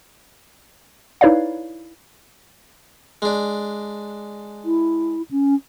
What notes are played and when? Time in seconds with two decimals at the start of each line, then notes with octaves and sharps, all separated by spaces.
1.21 D#4 E4 B4 C#5 D5 F5
3.22 G#3 D4
4.65 E4
5.31 C#4